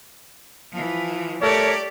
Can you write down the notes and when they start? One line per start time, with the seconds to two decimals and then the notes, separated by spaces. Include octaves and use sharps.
0.73 E3 F3
1.42 A3 G4 A#4 C#5 D5